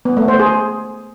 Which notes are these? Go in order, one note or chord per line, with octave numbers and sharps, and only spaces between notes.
B3
A3
C5
G#4